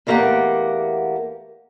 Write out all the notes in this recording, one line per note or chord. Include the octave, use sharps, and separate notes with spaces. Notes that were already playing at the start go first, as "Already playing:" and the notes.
E2 A3 A#3 E4 G4 F#5